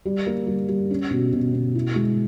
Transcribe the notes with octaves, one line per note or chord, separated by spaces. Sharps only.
G3
A#3
G3
G3
C#4
B2
B2
B2
E4
G#3